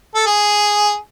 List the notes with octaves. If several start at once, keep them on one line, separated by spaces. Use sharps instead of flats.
A4
G#4